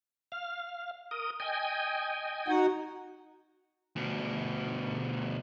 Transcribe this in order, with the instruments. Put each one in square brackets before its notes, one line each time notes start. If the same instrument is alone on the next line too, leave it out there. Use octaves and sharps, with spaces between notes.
[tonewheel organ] F5
A#4 D#6
D#5 G5 G#5
[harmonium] D#4 F#4 F#5
[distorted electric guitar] D2 B2